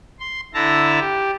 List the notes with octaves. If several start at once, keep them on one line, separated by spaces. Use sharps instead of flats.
C6
D3 E4 A5 A#5
G4